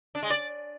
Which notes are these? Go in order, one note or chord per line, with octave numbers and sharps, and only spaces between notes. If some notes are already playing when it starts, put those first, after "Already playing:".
D4
G#3
D5